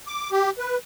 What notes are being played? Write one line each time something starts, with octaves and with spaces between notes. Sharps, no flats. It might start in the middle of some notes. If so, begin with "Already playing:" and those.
D6
G4
B4